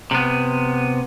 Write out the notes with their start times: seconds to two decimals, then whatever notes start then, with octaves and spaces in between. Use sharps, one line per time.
0.11 C3 B3